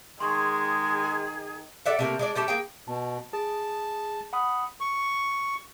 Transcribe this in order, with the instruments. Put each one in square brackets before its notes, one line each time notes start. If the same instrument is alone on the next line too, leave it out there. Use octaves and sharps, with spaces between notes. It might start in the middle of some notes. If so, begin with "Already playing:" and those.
[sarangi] D#3 [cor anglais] G#3 [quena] G#4 [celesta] C6 C#6 G#6
[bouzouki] A4 D5 E5 F#5
C3 A3 A#3
G#3 D4 D5
G3 A3 G4 A5
A#3 G#4 G5
[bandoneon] B2 [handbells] A5
[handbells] G#4 [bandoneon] A5
[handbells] F#5 B5 D#6
[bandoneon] C#6